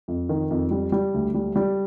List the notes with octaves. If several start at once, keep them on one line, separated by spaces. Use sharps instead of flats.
F2
D#3
F2
G3
G3
D2
G3
G3